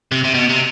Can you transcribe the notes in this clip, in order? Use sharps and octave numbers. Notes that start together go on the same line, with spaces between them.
C3
C3
B2
C3